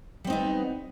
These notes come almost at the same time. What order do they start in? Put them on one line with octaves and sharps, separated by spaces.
G3 C4 D#4 B3